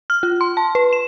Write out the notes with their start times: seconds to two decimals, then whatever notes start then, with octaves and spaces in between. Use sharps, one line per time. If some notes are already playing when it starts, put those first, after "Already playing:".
0.10 F6
0.23 F4
0.41 C6
0.57 A5
0.75 B4
0.93 E7